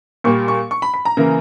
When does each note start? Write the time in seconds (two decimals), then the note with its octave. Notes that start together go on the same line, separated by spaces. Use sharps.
0.24 A#2 G3 A#3 C#6
0.48 C#6
0.71 C#6
0.82 B5
0.94 B5
1.05 A#5
1.17 C#3 E3 A#3